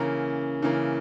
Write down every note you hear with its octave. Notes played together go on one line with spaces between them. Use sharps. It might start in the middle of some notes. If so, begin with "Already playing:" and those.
Already playing: C#3 E3 A#3 A#5
C#3 E3 A#3